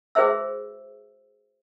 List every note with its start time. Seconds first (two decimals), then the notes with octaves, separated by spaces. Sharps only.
0.15 F#4 G#4 B4 C5 E5 E6